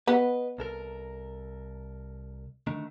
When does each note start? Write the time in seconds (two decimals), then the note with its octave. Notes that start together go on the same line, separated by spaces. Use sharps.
0.08 B3 B4 D#5
0.58 C2 A4 A#4
2.67 D3 D#3 A3